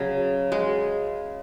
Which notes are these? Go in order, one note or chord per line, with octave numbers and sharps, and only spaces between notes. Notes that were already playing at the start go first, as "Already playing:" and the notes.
Already playing: C#3 F#3
G#3